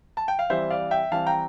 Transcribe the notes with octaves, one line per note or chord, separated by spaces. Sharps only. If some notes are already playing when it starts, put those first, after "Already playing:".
A5
G5
F5
E3 G3 C4 C5 E5
D5 F5
E5 G5
E3 G3 C4 F5 A5
G5 A#5